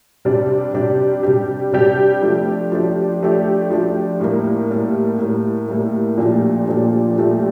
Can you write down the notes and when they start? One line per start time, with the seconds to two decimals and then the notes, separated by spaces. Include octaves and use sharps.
0.25 C3 G3 D4 G4
0.74 C3 G3 D4 G4
1.23 C3 G3 D4 G4
1.72 C3 G3 D4 G4
2.22 F3 A3 D4 G4
2.72 F3 A3 D4 G4
3.21 F3 A3 D4 G4
3.70 F3 A3 D4 G4
4.20 A2 G3 A#3
4.70 A2 G3 A#3
5.19 A2 G3 A#3
5.69 A2 G3 A#3
6.17 A#2 F3 A3 D4 G4
6.68 A#2 F3 A3 D4 G4
7.16 A#2 F3 A3 D4 G4